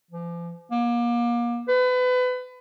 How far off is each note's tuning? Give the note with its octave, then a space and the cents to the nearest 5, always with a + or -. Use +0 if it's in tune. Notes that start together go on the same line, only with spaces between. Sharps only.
F3 -40
A#3 +35
B4 +30